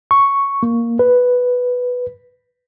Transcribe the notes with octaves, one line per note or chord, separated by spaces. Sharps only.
C#6
A#3
B4